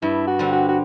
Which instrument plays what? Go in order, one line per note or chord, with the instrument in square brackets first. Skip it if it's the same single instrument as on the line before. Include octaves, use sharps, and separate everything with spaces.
[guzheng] G2 [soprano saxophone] E4
[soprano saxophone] F#4
[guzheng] D3 G3 C4
[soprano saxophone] F#4
F#4